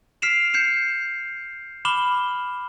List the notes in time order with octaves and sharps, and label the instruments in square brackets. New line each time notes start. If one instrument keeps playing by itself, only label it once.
[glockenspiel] F6 B6 C7 D7 E7 F7
G6 C7 C#7 E7
B5 D6 F6 E7 F#7 G7